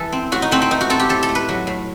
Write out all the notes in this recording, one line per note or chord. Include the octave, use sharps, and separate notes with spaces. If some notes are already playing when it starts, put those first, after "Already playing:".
Already playing: E3 A4
C4
A2 F#4
D#4
A3 C4
C4
E3 D#4
F#4
C4 A4
G4
A2 A4
A4
A3
B4
F#3
A2